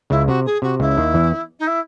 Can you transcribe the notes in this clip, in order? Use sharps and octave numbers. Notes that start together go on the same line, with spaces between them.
C#2 C#3 E4
C3 F#4
G#4
C3 F#4
C#2 C#3 E4
D#2 D#3
E2 E3
D#4
E4